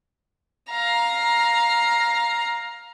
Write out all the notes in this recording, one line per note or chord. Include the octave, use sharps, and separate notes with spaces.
F5 A#5